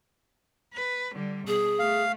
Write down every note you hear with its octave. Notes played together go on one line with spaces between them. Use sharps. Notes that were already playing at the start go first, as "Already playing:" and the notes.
B4
D3 G3
B2 G#4
A3 F5